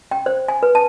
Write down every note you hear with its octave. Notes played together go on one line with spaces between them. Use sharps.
G5
C5
G#5
B4
A5